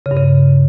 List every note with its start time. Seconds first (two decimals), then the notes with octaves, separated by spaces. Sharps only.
0.06 C#3
0.11 G2
0.16 C#3